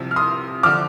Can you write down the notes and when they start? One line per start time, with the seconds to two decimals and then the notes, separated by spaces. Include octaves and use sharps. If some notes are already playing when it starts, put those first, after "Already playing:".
Already playing: C2 C3 F3
0.11 F6
0.16 C6 D#6
0.63 D3 F3 D6 F6